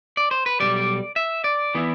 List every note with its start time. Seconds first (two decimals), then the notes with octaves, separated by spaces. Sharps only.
0.17 D5
0.31 C5
0.46 B4
0.60 B2 G3 D5
0.64 B1
1.16 E5
1.44 D5
1.75 E3 B3 E4